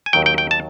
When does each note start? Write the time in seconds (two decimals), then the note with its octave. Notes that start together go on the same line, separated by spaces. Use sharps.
0.06 G#5
0.13 D#2 D#3 F#3 G5
0.26 G5
0.38 G5
0.51 A5